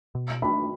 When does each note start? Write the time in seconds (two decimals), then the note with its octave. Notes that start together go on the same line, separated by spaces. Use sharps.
0.15 B2
0.42 A3 D4 B5